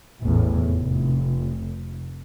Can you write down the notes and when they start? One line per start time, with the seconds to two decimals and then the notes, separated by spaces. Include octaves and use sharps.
0.22 A1 E2 A2
0.65 F1